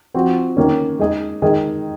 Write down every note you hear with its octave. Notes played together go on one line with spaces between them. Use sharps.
F3 C4 F#4
D#3 A#3 C#4
G#3 D#4 G#4
D#3 G#3 D#4 G#4